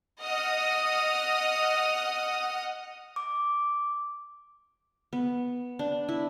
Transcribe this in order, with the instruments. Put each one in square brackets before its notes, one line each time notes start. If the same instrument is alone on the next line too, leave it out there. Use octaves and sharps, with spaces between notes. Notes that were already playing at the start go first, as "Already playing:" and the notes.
[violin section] D#5 F#5 D#6 F6
[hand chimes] D6
[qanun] B3
D4
E4